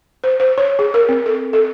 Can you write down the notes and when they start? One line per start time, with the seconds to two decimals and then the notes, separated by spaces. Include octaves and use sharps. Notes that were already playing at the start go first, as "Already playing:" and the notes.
0.24 C5
0.40 C5
0.58 C#5
0.79 G#4
0.94 A#4
1.09 C4
1.26 A4
1.53 A4